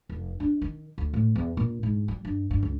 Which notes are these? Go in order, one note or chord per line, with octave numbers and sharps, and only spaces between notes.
F1
D4
D#3
D2
A2
E2
A#2
G#2
G3
G2
G2
C#2